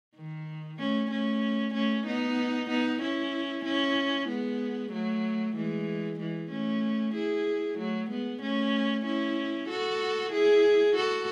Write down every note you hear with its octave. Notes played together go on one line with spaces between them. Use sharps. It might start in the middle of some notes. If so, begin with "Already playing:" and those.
D#3
A3 C#4
A3 C#4
A3 C#4
B3 D#4
B3 D#4
C#4 E4
C#4 E4
G#3 B3
F#3 A3
E3 G#3
E3 G#3
A3 C#4
E4 G#4
F#3 A3
G#3 B3
A3 C#4
C#4 E4
F#4 A4
E4 G#4
F#4 A4